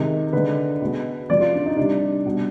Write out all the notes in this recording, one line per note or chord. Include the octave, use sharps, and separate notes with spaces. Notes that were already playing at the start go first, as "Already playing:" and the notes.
Already playing: C3 D#3 G#3
D3 G#3 B4
B2 G#3
C3 F3 G#3 D5
F4
D4
D#4
C3 G3 D4
B2 G3